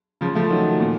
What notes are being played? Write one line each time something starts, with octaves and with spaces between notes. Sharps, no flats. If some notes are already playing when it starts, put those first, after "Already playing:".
C#3 F3
F3 A3
D#3 F#3
A#2